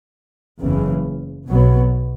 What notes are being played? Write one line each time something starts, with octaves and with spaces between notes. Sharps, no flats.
F#1 E2 C#3 E3
B1 B2 F#3 B3